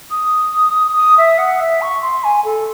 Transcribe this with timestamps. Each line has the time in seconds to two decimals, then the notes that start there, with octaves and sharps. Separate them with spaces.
0.10 D#6
0.95 D#6
1.18 E5
1.38 F#5
1.60 E5
1.81 C#6
2.02 C6
2.24 G#5
2.44 A4